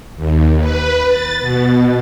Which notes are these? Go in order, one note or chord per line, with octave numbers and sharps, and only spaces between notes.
D#2
B4
A6
B2